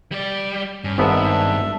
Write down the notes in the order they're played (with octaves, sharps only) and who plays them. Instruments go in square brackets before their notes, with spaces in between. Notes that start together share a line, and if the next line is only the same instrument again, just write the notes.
[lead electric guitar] G3 D5
[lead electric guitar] G2 [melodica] C#4
[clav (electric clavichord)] G#1 G#2 B3 [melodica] D4 E5